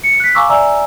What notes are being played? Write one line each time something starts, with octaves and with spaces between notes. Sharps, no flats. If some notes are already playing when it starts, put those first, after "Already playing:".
C#7
F#6 B6
F5 G#5 A#5 C#6 D6 E6
D5 E5 G#5 A#5 E6